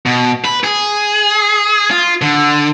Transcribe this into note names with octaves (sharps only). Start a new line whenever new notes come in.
B2
B4
G#4
F4
D3